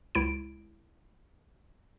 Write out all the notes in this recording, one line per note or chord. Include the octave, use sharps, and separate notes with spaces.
C#2 E4 D7